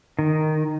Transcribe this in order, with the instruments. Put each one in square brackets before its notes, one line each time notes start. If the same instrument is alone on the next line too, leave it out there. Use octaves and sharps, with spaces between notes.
[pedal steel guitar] D#3